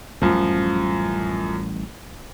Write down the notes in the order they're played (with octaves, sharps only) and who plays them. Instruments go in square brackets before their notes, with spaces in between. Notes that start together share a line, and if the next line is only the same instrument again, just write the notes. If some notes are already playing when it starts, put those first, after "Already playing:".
[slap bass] A1 G3 A3 [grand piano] F#2 F3